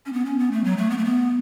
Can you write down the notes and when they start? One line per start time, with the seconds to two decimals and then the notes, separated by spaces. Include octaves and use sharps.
0.06 C#4
0.13 B3
0.25 C#4
0.39 B3
0.52 A3
0.64 F#3
0.77 A3
0.90 B3
0.98 A3
1.05 B3